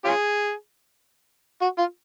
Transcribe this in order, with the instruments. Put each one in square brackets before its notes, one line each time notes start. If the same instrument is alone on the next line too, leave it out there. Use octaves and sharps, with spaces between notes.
[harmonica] C#4 F4 G#4
F#4
F4